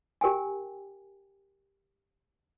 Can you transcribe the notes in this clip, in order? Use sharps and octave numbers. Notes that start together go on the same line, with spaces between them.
G4 A#4 G5 G#5